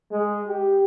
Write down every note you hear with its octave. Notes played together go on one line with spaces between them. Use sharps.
G#3
G4